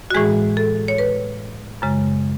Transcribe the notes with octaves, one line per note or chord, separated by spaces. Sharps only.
F#4
A2 E3 G#3 G#4
A4
C#5
B4
F#2 C#3 G#3